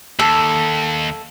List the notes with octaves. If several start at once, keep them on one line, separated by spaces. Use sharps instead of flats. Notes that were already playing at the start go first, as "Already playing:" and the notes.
D#2 A4